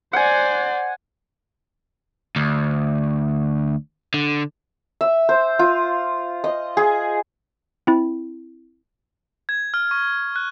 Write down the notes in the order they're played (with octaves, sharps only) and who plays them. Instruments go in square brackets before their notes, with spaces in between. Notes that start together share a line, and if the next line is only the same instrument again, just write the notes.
[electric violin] C5 D5 [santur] F#5 G#5
[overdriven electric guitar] D2
D3
[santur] E5
C5
F4
D#5
G#4
[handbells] C4 E4
[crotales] G#6
F6
C#6
F#6